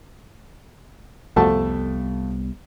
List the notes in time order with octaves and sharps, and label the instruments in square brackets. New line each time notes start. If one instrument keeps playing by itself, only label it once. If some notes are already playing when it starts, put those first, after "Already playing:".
[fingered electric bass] C2 G3 B3 [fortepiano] F2 A3 A5